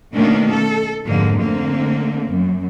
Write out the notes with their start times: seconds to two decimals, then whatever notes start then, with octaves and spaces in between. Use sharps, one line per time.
0.14 B2 D#3 A3 A#3 C#4 D4
0.50 A4
1.07 F2 G#2 D3 A#3
1.39 D3 A3 A#3 C4
2.30 F#2